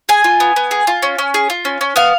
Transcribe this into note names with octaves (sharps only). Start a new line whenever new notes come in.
G#4 G#5
F4
B3
B3
G#4
F4
C#4
C#4
G#4
F4
C#4
C#4
B3 F5